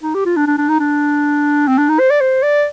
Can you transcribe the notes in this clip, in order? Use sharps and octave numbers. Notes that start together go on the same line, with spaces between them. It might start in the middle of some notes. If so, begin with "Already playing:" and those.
D#4
G4
F4
D4
D4
D4
D#4
D4
C4
D4
D#4
C5
D5
C5
D5